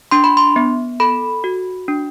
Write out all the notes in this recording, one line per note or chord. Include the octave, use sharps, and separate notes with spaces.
D4 C6
B5
C6
B3
A4 B5
F#4
D4